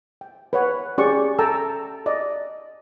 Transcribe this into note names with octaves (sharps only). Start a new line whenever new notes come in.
G5
B4 C#5 F#5
C#4 G4 G#4 D5 C#6
A4 G5 A5 A#5 E6
D5 D#5